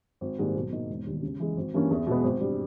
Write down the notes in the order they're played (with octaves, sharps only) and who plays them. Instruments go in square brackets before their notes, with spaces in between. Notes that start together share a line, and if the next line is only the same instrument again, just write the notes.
[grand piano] G#1
G#2 D#3 G3 A#3
B1
B2 A#3 D#4
E1
D#2 D#3 G3
C#3
E3 G#3
G#1
G2 E3 A#3 C#4
E2
B2 G#3 B3
G#1
G2 G3